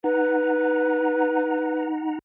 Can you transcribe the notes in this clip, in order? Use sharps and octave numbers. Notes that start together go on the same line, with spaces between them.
D#4 B4 F#5 A#5